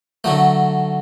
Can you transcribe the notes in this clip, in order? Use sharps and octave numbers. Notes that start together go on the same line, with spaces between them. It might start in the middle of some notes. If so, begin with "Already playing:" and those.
D3 F#3 A3